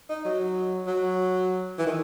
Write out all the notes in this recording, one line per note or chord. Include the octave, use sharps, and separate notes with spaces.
D#4
F#3
F#3
E3
D#3